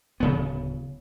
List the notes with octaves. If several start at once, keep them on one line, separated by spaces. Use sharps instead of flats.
D1 C#3 B3